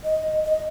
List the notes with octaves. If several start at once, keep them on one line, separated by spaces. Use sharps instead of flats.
D#5
D#5